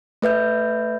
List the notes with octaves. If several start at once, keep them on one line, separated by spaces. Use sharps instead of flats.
A3 B4 E5 G6